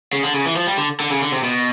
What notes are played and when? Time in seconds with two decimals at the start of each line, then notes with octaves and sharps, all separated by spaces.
0.13 C#3
0.23 D3
0.34 C#3
0.46 E3
0.56 F3
0.67 G3
0.77 D3
1.00 D3
1.10 C#3
1.22 D3
1.32 C3
1.43 B2